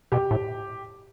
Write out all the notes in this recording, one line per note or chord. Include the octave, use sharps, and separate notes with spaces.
B2 G4
A2